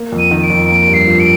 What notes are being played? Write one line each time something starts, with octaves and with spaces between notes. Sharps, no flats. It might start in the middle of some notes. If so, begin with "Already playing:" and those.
Already playing: A#3
F2
D#7
D#3
D7
F2
A#3 D7
G2
C7
F3
D7